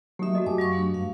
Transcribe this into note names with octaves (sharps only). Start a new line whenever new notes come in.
F#3 A3 A#3 D#4 G4 E5 D#6
F#4 A4 D#5
F#2 G4 G#5 A5 D6 D#6
F#3 F5 C#6
F#3 A3 D4
G2 F5